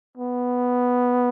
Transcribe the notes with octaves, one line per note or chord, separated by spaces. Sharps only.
B3